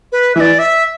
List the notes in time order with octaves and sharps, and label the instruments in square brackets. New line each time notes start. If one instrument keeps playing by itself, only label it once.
[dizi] B4
[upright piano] E3 [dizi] D5 E5
[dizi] E5